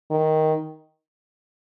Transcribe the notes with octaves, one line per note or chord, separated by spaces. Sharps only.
D#3